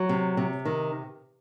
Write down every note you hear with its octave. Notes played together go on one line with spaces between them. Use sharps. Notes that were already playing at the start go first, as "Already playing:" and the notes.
Already playing: F#3
C3
C3
D#3